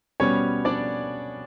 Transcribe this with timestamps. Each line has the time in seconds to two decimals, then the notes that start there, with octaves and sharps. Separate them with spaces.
0.20 B2 G3 B3 C#4 C#5
0.65 D4 D5